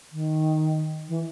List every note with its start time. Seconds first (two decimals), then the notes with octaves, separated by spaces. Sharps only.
0.12 D#3
1.09 E3